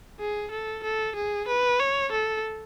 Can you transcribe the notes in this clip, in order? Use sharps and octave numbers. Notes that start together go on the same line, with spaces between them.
G#4
A4
A4
G#4
B4
C#5
A4